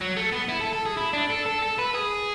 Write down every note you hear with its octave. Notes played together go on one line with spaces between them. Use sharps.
F#3
A3
B3
E4
A4
A4
G#4
E4
D4
A4
A4
A4
B4
G#4